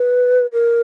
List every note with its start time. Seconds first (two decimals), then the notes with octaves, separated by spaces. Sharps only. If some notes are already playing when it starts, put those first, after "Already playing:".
Already playing: B4
0.53 A#4